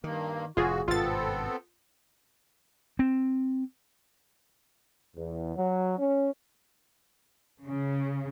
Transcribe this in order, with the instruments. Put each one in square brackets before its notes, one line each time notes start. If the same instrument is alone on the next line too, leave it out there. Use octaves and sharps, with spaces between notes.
[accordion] G2 A#3 [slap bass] D#3
[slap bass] F1 A2 [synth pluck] F4 G#4 [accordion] F#4
[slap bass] G#1 G2 B2 [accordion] B3 C4 A4 [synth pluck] F4 A6
[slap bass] C4
[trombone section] E2
F#3
C#4
[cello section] C#3